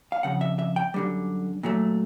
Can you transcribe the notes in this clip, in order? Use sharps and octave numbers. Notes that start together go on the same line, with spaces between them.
F5
F2 C#3 F#5
E5
E5
G5
F#2 D3 G3
A#2 F#3 A3